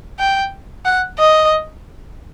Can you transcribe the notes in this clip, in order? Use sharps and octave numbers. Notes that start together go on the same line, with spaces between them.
G5
F#5
D#5